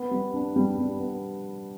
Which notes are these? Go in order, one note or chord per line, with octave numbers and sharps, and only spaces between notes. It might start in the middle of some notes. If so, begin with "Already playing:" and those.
Already playing: B3
G3
D4
G3
G3
B3